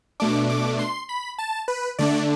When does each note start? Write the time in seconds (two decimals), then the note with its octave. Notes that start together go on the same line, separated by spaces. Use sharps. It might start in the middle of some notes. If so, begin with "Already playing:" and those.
0.20 B2 A3 D4 D6
0.50 D6
0.79 C6
1.09 B5
1.39 A5
1.68 B4
1.99 D3 A3 D4 D5